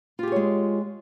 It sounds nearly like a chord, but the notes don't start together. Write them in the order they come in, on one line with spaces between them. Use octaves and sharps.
F4 G4 G#4 C#5 G#3